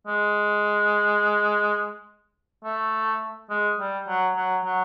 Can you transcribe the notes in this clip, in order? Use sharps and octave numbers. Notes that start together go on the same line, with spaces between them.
G#3
A3
G#3
G3
F#3
F#3
F#3